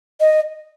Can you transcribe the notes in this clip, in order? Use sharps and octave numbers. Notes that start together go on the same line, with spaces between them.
D#5